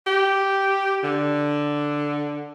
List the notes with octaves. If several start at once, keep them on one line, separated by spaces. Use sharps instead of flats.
G4
D3